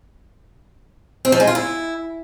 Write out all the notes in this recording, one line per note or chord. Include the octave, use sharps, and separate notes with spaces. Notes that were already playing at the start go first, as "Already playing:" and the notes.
C4
F3
G#3
F4
E4